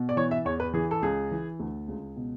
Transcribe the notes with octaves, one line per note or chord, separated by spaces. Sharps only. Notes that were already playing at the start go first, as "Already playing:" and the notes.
Already playing: B2
D5
E3 C#5
E5
E2 C#5
B4
E3 G#4
A4
C#2 G#4
E3
D2
C#2
B2